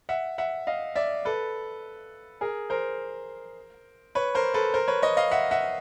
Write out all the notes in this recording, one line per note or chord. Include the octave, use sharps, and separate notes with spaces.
E5 F#5
E5 F#5
D#5 F5
D5 E5
A4 B4
G#4 A#4
A#4 C5
B4 C#5
A#4 C5
A4 B4
A#4 C5
B4 C#5
C#5 D#5
D#5 F5
E5 F#5
E5 F#5